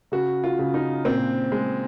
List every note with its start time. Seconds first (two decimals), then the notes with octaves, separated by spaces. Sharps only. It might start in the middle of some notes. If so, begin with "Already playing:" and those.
0.12 C#3 F#4
0.44 F4
0.59 C#3
0.74 D#4
1.05 A#2 C4
1.52 G#3